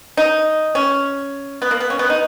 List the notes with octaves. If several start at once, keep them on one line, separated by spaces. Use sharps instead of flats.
D#4
C#4
B3
A#3
B3
C#4
B3
D#4